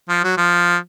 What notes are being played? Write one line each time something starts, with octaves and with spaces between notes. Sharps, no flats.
F3
F#3
F3